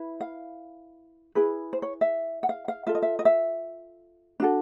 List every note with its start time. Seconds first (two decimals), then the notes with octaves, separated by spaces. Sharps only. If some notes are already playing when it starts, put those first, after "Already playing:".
Already playing: E4 B4
0.21 F5
1.35 E4 G#4 B4
1.73 C5
1.82 C#5
2.01 E5
2.43 F#5
2.49 F5
2.68 F5
2.87 F4 A4 E5
2.95 D#5
3.02 E5
3.19 D#5
3.25 E5
4.40 D4 F#4 A4